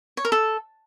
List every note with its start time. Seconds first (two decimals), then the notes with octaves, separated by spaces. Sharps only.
0.17 C#5
0.25 A#4
0.32 A4